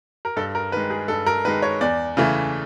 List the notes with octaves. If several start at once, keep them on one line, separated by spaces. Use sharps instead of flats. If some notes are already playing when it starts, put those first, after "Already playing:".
A#4
G2 A4
A#4
D#3 G#3 B4
G#4
G2 A4
A#4
D#3 G#3 B4
C#5
E2 D5
C#3 E3 A3